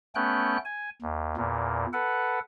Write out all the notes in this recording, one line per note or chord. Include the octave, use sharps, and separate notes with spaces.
A3 B3 C#4 G5 F#6
G#5
D#2
E2 A#2
A4 B4 F#5